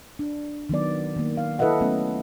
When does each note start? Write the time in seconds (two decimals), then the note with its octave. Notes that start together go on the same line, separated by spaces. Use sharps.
0.19 D4
0.69 D#3 F#3 B3 D5
1.16 D#3 A#3
1.37 F5
1.59 E4 A4 B4 D#5 E5 F#5
1.81 F#3 A3 B3 C#4